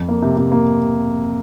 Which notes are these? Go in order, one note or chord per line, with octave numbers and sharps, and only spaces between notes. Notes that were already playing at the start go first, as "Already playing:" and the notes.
Already playing: F2
A#3
C3
C3
A#3